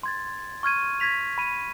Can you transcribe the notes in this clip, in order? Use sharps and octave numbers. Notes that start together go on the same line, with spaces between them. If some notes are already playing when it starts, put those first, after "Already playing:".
C6 G#6 A6
C#6 F6 G#6 D#7
G#6 A#6 B6 F7
B5 D#7